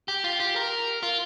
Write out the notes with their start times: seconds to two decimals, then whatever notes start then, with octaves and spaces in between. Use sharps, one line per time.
0.08 G4
0.24 F4
0.39 G4
0.56 A#4
1.03 F4